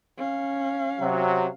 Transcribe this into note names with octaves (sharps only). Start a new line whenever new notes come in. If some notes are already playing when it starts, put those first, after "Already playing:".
C#4 F5
C3 F#3